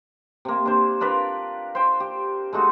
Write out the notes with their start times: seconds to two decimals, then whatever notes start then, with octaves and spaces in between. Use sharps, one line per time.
0.45 C3 A#3
0.66 D4 C5
1.01 D4 F4 A#4 B4
1.75 C5 G5
2.00 G4
2.53 G#3 A3 D#4 F#4